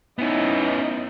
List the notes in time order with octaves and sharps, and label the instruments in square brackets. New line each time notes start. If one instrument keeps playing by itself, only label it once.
[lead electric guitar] B3 C#4 [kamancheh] D#4 E4